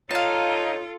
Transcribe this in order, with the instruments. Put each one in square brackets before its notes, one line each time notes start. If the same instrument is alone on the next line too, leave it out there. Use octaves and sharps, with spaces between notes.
[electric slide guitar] D#4 [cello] F4 A4 [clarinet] C#5 [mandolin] F5 A5